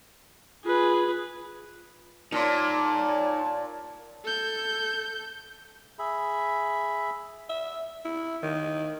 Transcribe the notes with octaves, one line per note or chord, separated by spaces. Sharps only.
F4 G#4 B4
A#2 D#4 C#5 D5 A5 C6
A4 G6
G#4 E5 B5
E5
E4
D#3